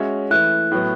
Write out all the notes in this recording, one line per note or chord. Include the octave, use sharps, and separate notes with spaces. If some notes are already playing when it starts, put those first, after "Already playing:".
Already playing: G#3 C#4 F#4 C#5 E5
E3 A3 E4 F#6
A2 F#3 B3